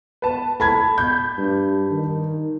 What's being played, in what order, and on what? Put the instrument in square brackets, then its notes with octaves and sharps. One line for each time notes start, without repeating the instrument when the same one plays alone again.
[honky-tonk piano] B4 A5
[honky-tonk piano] A4 [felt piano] A5 B5 G#6
[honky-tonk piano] G6
[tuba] G2
D#3